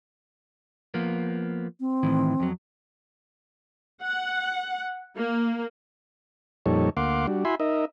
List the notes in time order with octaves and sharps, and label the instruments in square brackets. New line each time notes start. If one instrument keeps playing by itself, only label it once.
[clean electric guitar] F3 A#3 B3
[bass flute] C4
[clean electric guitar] A2 D#3 E3
F2 F#3
[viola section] F#5
A#3
[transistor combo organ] F2 A#2 G3 D#4 A4 C#5
D2 A#3 F5 F#5 C6 D6
G3 D4 F#4
E4 F#4 E5 G#5 B5 C6
D#4 A#4 D#5 E5